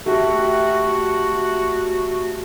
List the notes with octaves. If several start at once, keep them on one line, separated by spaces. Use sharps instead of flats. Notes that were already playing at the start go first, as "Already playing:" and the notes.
A3 F#4 G4 E5